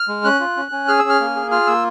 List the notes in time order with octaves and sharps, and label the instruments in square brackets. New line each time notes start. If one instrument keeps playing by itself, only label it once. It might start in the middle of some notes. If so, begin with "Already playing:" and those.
Already playing: [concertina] F6
G#3
C#4 F#6
F4
C#4
C#4
G#4 F6
E6
C#4
F6
A#3
G#4
F4 F6
A#3 E6